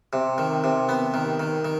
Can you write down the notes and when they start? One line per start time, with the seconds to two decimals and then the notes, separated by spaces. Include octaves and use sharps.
0.13 C3
0.38 D#3
0.64 C3
0.89 B3
1.14 D#3
1.40 D#3
1.65 D#3